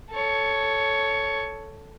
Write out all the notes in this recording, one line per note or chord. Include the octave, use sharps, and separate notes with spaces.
A4 C#5